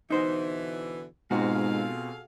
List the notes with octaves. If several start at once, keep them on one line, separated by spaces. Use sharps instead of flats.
B2 D3 E3 D#4 C5
G#2 B2 C4 F4 F#4 G#4 A4 F5